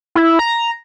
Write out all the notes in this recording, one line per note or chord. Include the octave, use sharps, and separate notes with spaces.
E4
A#5